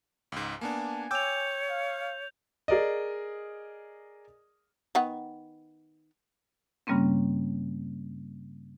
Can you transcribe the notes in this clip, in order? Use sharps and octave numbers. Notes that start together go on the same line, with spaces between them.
C#2 G#2
A#3 B3 D4 G#5 A5
C#5 G5 D6 E6 G6 F7
F5
G#4 A#4 D5 D#5
D#3 B3 F#5
G2 C#3 G3 A#3 C4 C#4